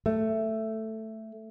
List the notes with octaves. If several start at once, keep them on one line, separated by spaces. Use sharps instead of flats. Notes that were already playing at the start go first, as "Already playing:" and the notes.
A3